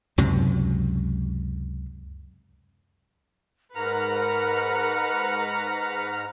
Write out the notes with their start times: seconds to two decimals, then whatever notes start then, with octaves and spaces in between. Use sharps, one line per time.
0.18 C#2 F#2 C3 F#3
3.75 G#2 A#4 B4 F#5 A#5 F6